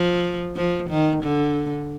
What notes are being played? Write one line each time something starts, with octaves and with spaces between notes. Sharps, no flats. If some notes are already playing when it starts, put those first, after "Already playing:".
Already playing: F3
F3
D#3
D3